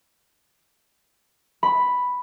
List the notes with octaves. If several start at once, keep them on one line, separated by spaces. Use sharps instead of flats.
B5